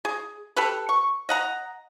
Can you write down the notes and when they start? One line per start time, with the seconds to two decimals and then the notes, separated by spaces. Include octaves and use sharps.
0.05 G#4
0.56 G4 A4 B4
0.89 C#6
1.29 D#5 F#5 A#5